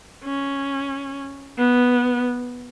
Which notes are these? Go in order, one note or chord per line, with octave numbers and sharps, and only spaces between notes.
C#4
B3